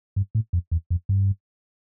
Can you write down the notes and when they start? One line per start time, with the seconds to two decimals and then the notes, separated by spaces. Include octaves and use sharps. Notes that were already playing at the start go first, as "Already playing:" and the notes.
0.16 G2
0.35 A2
0.53 F2
0.71 E2
0.90 F2
1.09 G2